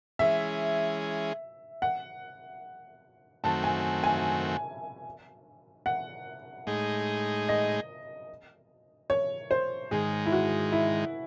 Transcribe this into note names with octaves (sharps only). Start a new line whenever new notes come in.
E3 G#3 C#4 G#4 E5
F#5
F#2 D#3 A3 C4 F#4 A5
G#5
G#5
F#5
A2 G#3 D#4 G#4
D#5
C#5
C5
G#2 D#3 G#3 G#4
E4
F#4
E4